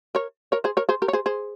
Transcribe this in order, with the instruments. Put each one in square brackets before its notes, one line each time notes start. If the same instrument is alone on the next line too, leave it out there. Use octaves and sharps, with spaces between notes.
[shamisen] A#4 C#5
A#4 C#5
G#4 C5
A#4 C#5
G#4 C5
G4 A#4
C#5
G#4 C5
G#4 C5